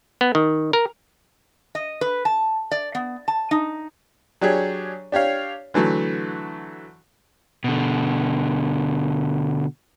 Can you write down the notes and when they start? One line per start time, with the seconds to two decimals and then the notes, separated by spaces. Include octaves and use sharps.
0.21 B3
0.35 D#3
0.73 A#4
1.75 D#5
2.01 B4
2.25 A5
2.71 D5
2.95 B3
3.28 A5
3.51 D#4
4.41 F#3 D4 G4 G#4 C#5
5.12 D4 G4 C#5 F5
5.74 D3 E3 F#3 A3
7.64 B2 D3